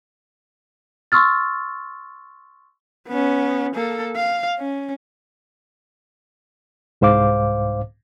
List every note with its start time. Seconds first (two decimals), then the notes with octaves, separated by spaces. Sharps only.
1.12 C6 C#6 E6 F6 A6
3.08 B3 C#4
3.75 A#3 A4
4.17 F5
4.59 C#4
7.01 C2 G#2 C5 F5 D6